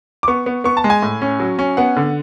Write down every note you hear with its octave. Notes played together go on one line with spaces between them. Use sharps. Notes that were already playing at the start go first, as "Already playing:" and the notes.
D6
B3 C#6
B3
B3 C#6
A5
G#3
G#5
A2
C#4
F#3
C#4
B3 F#5
D3